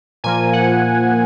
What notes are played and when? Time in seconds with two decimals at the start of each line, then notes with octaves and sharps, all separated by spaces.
0.24 A#2 F3 A#3 G#5
0.53 F#5